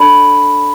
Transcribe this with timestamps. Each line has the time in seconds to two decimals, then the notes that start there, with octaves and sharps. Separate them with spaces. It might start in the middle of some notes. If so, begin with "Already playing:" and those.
Already playing: D4 A4 D5 A5 B5